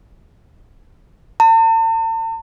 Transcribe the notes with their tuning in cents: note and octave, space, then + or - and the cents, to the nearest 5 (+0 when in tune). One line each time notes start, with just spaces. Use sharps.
A5 +45